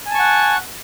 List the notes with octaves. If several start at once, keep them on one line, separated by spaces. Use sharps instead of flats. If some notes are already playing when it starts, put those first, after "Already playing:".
F#5 G#5 A5 C#6